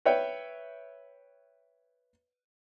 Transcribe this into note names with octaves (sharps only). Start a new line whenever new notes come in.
B4 C#5 E5 G5